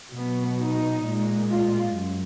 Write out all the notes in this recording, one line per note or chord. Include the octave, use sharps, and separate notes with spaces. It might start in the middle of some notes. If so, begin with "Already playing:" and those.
B2 F#3 B3
D#4
A#2 G#3
F4
F#2